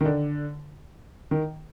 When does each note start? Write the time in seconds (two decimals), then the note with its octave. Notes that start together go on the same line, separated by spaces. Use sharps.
0.01 D#3
0.06 D3
1.31 D#3